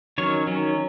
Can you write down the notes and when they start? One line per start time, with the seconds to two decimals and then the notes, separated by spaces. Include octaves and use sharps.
0.18 D#3 F#3 C#4 C#5
0.47 D#3 F#3 C#4